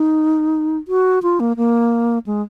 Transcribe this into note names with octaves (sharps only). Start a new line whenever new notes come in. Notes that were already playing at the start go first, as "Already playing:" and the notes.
Already playing: D#4
F#4
F4
A#3
A#3
G#3